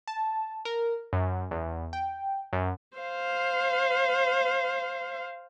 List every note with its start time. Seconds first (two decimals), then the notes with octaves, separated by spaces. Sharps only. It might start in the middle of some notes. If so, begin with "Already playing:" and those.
0.07 A5
0.65 A#4
1.13 F#2
1.51 E2
1.93 G5
2.53 F#2
2.97 C5 F5